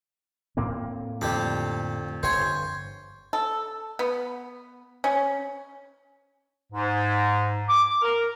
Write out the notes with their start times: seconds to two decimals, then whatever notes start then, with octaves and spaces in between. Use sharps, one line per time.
0.57 A2 A#3 C4
1.21 F2 D3 G4 D6
2.23 G1 C5 C#5 G#5
3.33 A4
3.99 B3
5.04 C#4
6.73 G#2
7.68 D6
8.02 A#4